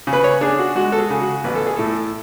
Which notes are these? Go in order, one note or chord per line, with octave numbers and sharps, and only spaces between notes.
C#3
B4
C#5
D4 G#4
F#4
G#3 F#4
A4
G#4
C#3
F#4
A1 B4
A4
G#4
A2 A4